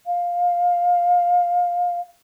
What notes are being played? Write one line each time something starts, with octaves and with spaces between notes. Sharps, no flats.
F5